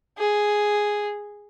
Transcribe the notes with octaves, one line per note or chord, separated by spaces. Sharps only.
G#4